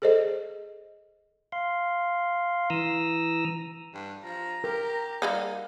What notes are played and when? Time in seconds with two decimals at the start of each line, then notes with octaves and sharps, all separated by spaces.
0.02 G#4 A4 C5 D5 D#5
1.52 F5 C6
2.70 E3 A#5 D#6 E6
3.94 G2
4.24 F3 A#5
4.64 G4 A#4
5.22 G3 A#3 D#4